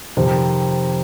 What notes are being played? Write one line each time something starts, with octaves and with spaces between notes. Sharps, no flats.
F2 C3 D#3